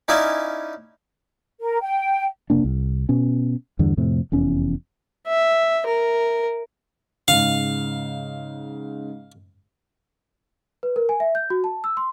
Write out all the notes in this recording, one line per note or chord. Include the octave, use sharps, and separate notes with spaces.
C#4 D#4 E4 D5 F5 G#5
A#4
G5
F1 C3 A#3 D4
C2
B2 C#4
E2 G2 D3
F2 A2 C3
F1 E2 C#4
E5
A#4
G#2 C#3 F5
B4
A#4
G#5
E5
G6
F#4
A5
E6
C6